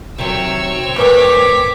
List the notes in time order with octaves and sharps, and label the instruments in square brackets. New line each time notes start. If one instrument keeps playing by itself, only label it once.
[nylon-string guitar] C3 D#3 F#3 [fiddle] C4 C#5 [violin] E6
[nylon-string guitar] E2 G#2 G5 [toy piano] A#4 B4 C#6 [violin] D6 B6